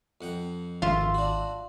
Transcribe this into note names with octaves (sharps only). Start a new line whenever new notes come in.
F2 F#5 G5
G#1 F4 E5
D4 F#4